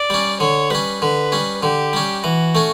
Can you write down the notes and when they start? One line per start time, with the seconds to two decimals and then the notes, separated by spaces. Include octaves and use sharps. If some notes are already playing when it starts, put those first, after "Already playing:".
Already playing: D5
0.10 G3 C#4
0.40 D3 C#5
0.70 G3 C#4 B4
1.01 D3 B4
1.32 G3 C#4
1.63 D3 G4
1.93 G3 C#4
2.24 E3 F#4
2.55 A3 C#4